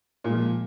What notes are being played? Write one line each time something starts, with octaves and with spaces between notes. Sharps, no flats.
A#2 F3 G#3